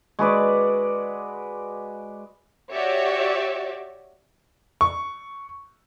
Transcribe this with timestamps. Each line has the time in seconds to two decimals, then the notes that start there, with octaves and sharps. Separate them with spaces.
0.19 G#3 F#4 B4 D5
2.72 F#4 G4 C#5 D5 E5
4.81 C#6